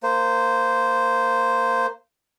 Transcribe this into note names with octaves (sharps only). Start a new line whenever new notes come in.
A#3 C5